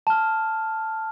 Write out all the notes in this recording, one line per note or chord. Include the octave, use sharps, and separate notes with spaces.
A5 F6